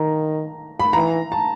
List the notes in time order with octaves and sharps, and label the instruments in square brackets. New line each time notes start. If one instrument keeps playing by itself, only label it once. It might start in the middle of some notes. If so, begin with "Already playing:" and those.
Already playing: [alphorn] D#3 [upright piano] A#5
[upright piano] B5
[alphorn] E3 [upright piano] A#5
[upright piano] A5